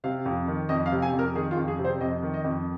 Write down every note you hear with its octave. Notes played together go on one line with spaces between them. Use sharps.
C3 F5
F2
D#3
F2 D#5
F5
C3
G#5
F2
A#4
D#3 G#4
F4
F2
G#4
C3
C5
F2 D#5
D#3
D#5
F2